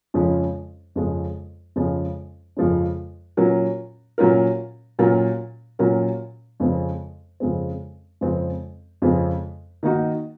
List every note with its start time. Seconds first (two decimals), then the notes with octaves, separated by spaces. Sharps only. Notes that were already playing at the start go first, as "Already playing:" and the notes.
0.14 F2 C#3 F3 G#3 C#4
0.96 F2 C#3 F3 G#3 C#4
1.76 F2 C#3 F3 G#3 C#4
2.57 F2 C#3 F3 G#3 C#4
3.37 A#2 F#3 C#4 F4 A#4
4.18 A#2 F#3 C#4 F4 A#4
4.99 A#2 F#3 C#4 F4 A#4
5.79 A#2 F#3 C#4 F4 A#4
6.60 F2 C#3 G#3 C4
7.40 F2 C#3 G#3 C4
8.21 F2 C#3 G#3 C4
9.02 F2 C#3 G#3 C4
9.83 D#3 A#3 D#4 F#4